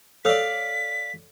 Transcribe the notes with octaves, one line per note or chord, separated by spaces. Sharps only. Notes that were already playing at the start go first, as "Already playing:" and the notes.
A4 C#5 D5 F5 E6 B6